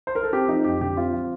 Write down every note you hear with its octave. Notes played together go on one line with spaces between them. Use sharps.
C5
A#4
A4
C4 G4
F3 D#4
F2 G4
D3 G4
C4 F4
F3